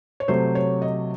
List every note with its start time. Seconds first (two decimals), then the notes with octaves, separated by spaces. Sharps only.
0.20 C#5
0.28 C3 F#3 A3 C5
0.55 C#5
0.82 D#5